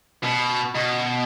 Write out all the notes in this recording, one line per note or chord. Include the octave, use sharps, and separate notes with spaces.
B2
B2